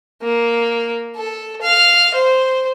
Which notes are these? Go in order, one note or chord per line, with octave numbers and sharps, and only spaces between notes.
A#3
A4
F5
C5